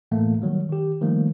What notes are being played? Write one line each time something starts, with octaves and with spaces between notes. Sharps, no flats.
A2 E3 A3 A#3
D#3 F#3 G3
D#3 G4
D#3 F3 G3 A3 A#3